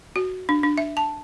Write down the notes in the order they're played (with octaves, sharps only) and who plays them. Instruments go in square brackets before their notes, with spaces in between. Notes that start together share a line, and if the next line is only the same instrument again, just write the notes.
[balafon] F#4
D4
D4
E5
A5